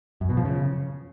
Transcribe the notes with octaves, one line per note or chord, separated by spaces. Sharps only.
F#2
B2
F3
C#3